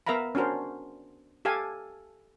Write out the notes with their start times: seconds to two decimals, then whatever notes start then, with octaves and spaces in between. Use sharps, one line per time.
0.07 B3 A#4 E5 F5 A#5 B5
0.35 C#4 D4 F#4 A#4 C5
1.45 G4 A4 F5 G#5